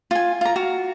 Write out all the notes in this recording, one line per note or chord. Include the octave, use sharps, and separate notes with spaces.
F4 G#5
F4 A#5
F#4 F5